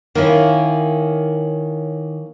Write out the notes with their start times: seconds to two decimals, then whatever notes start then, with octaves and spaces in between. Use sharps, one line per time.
0.15 D#3 A#3 C#4 E4